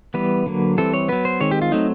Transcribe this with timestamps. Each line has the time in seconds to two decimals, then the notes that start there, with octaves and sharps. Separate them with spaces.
0.14 E3 G3 B3 B4
0.46 D3 F#3 A#3
0.78 E3 G3 C4 A4
0.94 C#5
1.09 F#3 B3 B4
1.25 C5
1.40 D#3 G#3 C4 C#5
1.51 G4
1.62 F4
1.72 F#3 A3 C4 D#4